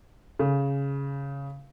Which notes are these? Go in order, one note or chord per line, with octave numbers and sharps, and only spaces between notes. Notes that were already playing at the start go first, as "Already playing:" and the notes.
C#3